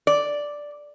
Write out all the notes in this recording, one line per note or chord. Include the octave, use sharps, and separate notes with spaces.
D5